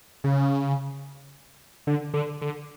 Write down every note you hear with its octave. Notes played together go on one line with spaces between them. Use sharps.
C#3
D3
D3
D3